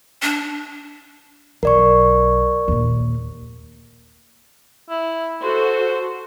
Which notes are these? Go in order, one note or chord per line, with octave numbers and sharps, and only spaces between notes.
D4
B1 A#4 D5 C#6
D#2 A#2
E4
F#4 A4 C5